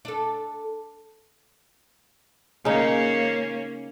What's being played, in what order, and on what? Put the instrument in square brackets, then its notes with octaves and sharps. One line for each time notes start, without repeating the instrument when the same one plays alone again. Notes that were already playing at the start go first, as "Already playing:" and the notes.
[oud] D4 A4
[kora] C#3 D#4 [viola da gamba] A#3 C#4